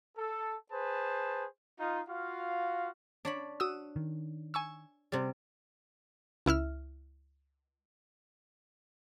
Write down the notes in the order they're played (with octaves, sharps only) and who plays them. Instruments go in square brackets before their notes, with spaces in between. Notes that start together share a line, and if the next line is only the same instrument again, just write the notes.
[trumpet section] A4
G#4 B4 C5 A5
D#4 F4
F4 F#4 F5
[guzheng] D4 C#5 B5
[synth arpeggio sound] F#4 D#6 E6
[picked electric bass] D#3
[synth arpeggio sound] G#5 C#6 E6
[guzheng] C3 G3
[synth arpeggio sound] C#2 E4 E5 F6